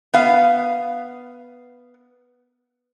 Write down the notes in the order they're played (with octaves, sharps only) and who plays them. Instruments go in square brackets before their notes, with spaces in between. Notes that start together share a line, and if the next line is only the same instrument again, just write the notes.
[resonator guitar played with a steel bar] B3 F5